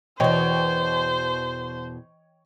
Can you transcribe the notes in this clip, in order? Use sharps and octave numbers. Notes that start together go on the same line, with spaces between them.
E2 B2 E3 C5 C#5 D#5 G5